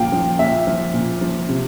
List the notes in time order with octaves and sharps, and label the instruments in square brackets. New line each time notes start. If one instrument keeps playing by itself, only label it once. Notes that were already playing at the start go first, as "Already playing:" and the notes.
Already playing: [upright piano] A#2 F3 F5 G5
F3
A#2 E5
F3
A#2
F3
C3